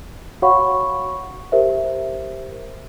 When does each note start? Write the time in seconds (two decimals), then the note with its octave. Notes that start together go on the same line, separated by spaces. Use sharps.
0.42 F#4 C#5 F5 F#5 B5 C#6
1.52 G4 A#4 C5 E5